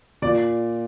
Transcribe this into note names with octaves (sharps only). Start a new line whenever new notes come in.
A#2 D5